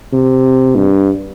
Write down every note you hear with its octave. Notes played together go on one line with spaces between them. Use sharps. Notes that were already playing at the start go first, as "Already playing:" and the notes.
C3
G2